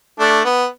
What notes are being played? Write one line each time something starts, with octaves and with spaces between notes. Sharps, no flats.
A3 D4
B3